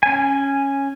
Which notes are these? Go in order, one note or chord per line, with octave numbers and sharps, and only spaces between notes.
C#4 G#5